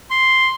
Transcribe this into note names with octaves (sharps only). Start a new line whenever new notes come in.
C6